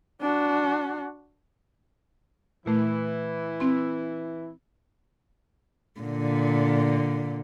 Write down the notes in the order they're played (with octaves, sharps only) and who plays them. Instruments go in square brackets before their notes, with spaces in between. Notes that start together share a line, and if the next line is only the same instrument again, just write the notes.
[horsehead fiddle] D4 F#4
[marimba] A#2 A3 [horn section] E3 E4
[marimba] C4 C6
[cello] A#2 D3